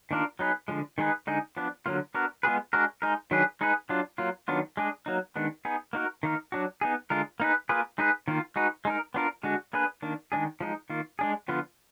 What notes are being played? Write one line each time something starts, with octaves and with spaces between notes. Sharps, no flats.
D#3 A#3 D4 F4 A#4
F#3 B3 D#4 G#4 B4
D3 F3 G#3
D#3 G#3 D#4 G#4 B4
D3 G#3 D#4 G#4
F3 B3 D4
D3 F#3 A#3 F4
B3 D4 F#4 A#4
G#3 B3 F4 G#4 B4
G#3 D4 F#4 A#4
G#3 D#4 A#4
D#3 F#3 D4 G#4 B4
G#3 D#4 G#4 B4
F#3 D4 F4
F#3 A#3 F4
D#3 F#3 B3 D4 F4
G#3 D4 G#4
F#3 A#3 D#4
D#3 G#3 B3 D4
B3 D#4 G#4
A#3 D#4 F#4 A#4
D#3 A#3 D#4 A#4
F#3 D4 F#4
B3 D#4 G#4
D3 G#3 D4 F4 A#4
A#3 D#4 G#4 B4
A#3 F4 G#4 B4
G#3 D#4 G#4 B4
D#3 A#3 F4
G#3 D#4 F#4 B4
G#3 D#4 A#4
B3 D4 F4 A#4
D3 G#3 D4 F#4
A#3 D4 G#4 B4
D#3 A#3 D4
D#3 G#3 D4 G#4
F3 G#3 D#4
D#3 A#3 F4
G#3 D4 G#4
D3 F3 B3 F4